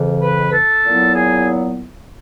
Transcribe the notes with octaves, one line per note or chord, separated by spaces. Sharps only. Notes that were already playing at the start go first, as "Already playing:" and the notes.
Already playing: F2 C#3 E3
B4
A4
A#2 F#3 B3 E4
G#4